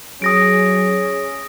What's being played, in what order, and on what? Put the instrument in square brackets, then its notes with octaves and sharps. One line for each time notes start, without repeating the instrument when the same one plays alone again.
[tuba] F#3 [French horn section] C#4 G#4 [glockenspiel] D#6 A#6 D7